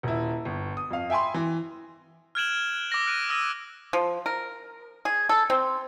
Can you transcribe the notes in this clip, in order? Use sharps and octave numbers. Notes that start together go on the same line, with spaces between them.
D#1 E4
G1
D#6
F2 F5
E5 G5 G#5 B5 C6
E3
F6 F#6 G#6 D7 E7 F#7
D6 E6 A#6 F#7
F6 F#6 D7 D#7
D#6 E6 A#6 D#7
F3
A#4
G#4
A4
C4